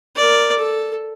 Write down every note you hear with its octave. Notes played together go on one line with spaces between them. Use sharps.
A#4 D5
A4